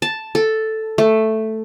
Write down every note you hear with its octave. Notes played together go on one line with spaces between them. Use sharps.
A5
A4
A3